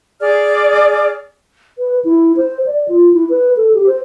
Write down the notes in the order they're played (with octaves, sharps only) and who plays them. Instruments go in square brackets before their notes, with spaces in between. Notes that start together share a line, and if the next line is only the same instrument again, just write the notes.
[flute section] G#4 D5 F6
[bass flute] B4
E4
C5
D5
F4
E4
B4
A4
G4
C5